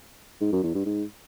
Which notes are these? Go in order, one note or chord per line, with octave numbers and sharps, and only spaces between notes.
G#2
F#2
E2
G2
G#2